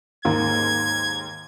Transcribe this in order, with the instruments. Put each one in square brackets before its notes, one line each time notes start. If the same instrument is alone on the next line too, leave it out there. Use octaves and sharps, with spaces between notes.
[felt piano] D#2 G#2 A#3 [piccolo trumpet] G#6